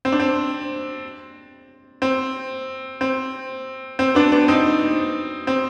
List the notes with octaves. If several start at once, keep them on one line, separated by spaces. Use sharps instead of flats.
C4
D4
C4
C4
C4
C4
B3 D4
B3 D4
C4 D#4
C4